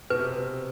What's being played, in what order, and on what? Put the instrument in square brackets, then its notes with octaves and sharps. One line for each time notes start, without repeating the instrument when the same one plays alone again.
[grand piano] B2 [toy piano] B4
[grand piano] C3